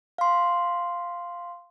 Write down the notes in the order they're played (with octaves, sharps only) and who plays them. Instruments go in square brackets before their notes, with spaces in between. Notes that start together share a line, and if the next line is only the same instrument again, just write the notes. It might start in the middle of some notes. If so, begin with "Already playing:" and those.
[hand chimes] F5 C6